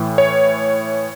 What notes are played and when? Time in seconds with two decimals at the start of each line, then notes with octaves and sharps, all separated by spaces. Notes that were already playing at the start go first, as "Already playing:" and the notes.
Already playing: A2 E3
0.18 C#5